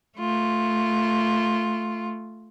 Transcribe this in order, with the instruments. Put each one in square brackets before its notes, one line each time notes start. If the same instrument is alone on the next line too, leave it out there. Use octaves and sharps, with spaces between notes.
[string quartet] A3 F4